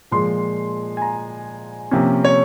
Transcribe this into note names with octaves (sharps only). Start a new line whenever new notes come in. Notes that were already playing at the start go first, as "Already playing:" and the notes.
A#2 F3 G#3 C6
G#5
A#5
C3 F3 A#3 C#4
C#5